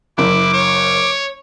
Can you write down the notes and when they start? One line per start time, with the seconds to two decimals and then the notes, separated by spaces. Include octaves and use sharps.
0.18 F#1 E4 D6
0.54 C#5